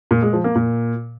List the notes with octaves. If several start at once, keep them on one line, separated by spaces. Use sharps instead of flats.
A#2
G#3
F3
A#3
A#2